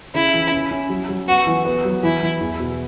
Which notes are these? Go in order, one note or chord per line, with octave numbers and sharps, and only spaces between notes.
C#3 E4
E3
C#4
C#4
F#3
F#3
B3 F#4
E3
B3
F#3
E3 E4
E3
E2
B2